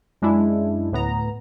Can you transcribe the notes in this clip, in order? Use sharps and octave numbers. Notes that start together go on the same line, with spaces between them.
F#2 G#3 D4 E4
D2 A2 B3 A#5